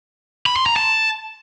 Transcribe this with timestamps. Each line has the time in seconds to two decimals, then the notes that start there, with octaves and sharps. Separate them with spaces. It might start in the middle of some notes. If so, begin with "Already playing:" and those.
0.46 B5
0.56 C6
0.66 A#5
0.76 A5